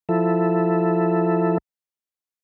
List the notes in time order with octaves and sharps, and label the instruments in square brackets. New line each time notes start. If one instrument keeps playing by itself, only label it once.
[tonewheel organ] F3 E4 A4